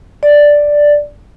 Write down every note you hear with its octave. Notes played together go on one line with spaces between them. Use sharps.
D5